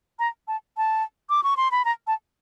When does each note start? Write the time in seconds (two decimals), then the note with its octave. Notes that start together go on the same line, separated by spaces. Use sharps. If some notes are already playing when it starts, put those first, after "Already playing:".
0.19 A#5
0.48 A5
0.77 A5
1.30 D6
1.44 C#6
1.57 C6
1.71 B5
1.85 A#5
2.07 A5